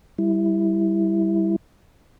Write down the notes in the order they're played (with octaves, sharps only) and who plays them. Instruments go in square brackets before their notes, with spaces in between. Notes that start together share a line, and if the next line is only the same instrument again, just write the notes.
[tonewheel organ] G3 E4